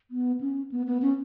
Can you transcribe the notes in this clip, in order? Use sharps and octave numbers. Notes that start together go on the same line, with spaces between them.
B3
C#4
B3
B3
C#4